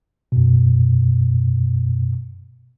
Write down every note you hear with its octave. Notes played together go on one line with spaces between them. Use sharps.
F#2 B2